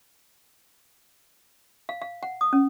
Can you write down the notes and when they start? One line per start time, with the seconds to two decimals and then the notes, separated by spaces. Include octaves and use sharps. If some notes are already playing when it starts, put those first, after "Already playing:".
1.89 F5
2.02 F5
2.23 F#5
2.41 D#6
2.53 C#4